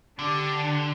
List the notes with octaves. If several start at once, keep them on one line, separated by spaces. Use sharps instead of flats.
D3 D4 G4